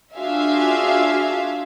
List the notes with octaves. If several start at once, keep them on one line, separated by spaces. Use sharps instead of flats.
D4 F4 F#4 G#4 E5 F5